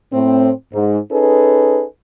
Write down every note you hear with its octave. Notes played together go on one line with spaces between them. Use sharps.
A2 C4
G#2
C#4 D#4 G#4 A4 B4